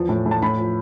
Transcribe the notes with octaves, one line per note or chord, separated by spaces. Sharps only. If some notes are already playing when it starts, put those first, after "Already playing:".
Already playing: E2 F3
A2
A2
A5
A2 B5
F3